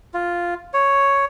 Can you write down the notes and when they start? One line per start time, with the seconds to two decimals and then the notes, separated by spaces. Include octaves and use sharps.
0.14 F4
0.73 C#5